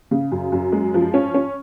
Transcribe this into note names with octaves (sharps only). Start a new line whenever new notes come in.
C#3
F#2
F#2
G#3
F3
C#4
C#4